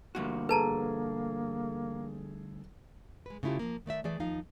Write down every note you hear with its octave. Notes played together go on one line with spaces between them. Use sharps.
D2 G2 A#3 F#4
G#4 A4 B4 A5 A#5
G#3 B4
C#3 A3 E4 F4 G4
F3 A#3
D#3 A3 D5 E5
E3 A3 G#4 D5
D#2 F3 D#4 F5